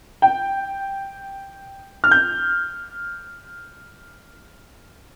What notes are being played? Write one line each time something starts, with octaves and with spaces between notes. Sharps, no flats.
G5
F6
G6